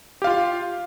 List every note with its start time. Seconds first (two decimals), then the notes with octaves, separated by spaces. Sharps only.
0.22 G4
0.24 F5
0.27 F4